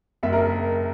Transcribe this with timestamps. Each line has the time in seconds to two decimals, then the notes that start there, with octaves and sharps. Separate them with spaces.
0.23 F#1 E5
0.33 A#4